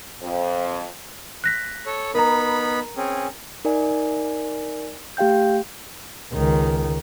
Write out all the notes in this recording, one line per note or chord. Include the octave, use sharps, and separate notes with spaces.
F2
F#6 A#6 B6
A4 C#5
B3 D#4 A#4 A#5 B5
C4 C#4 G#4
D#4 A#4 D5 E5 G#5
A3 G4 F5 G5 G6
C#2 D#3